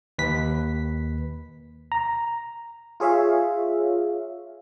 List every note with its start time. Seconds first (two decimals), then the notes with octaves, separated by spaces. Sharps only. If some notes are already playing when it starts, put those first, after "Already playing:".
0.19 D#2 B4 B6
1.92 A#5
3.00 F4 G#4 C#5 E5 F5